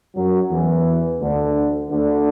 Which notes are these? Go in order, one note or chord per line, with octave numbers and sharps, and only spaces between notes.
F#2 F#3
E2 E3
D2 D3
D2 D3